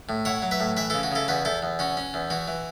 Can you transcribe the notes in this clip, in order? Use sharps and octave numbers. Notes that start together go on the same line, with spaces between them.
A2
E4 C#5 F#5
F#3
B4 E5
A2
E3 B4 E5
C#3 E4 A4
F#4
C#3 E4 A4
E2 F#4 B4
E2 E4 A4
E2
C#4 F#4
C#4
E2
E3 F#4
E3